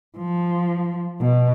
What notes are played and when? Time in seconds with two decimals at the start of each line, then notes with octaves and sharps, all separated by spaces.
0.18 F3
1.21 B2